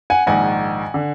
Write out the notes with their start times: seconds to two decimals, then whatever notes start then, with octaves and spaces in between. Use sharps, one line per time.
0.10 F#5 G#5
0.27 A#1 G#2 D#3 F#5 G#5
0.94 D3